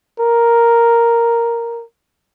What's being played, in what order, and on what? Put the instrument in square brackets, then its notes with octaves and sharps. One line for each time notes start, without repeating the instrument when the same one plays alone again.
[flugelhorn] A#4